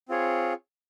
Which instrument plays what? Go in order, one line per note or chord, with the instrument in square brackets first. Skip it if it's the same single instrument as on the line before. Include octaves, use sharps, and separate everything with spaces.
[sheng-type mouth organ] C4 F4 G#4 C#5